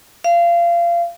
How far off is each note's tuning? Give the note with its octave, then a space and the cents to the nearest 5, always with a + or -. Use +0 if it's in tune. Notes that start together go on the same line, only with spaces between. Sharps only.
F5 -25